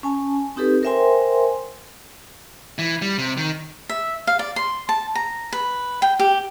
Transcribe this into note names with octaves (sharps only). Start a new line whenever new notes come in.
C#4 G#5 A5
C4 D#4 G4 A4 B4
A#4 C5 E5 G5 G#5 C6
E3
G3
C3
D#3
E5
F5
D5
C6
A5
A#5
B4
G5
G4